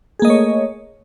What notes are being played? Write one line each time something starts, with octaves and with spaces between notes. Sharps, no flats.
A3 A#3 G#4 C#5 D#5